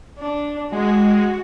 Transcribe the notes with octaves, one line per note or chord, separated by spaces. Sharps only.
D4
G#3 F#4